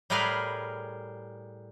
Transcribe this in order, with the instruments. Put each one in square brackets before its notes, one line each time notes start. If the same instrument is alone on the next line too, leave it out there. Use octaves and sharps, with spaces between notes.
[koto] A2 G3 G#4 A#4 B4 F5